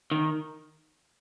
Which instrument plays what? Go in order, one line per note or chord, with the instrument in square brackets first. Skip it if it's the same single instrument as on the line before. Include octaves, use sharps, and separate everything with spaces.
[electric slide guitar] D#3